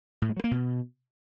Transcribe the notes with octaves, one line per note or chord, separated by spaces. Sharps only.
A2
G#3
F#3
A#3
B2